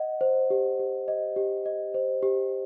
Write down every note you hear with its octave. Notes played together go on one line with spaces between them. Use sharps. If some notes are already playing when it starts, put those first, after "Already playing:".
Already playing: D#5 F#5
C5
G4
G4
D#5
G4
D#5
C5
G4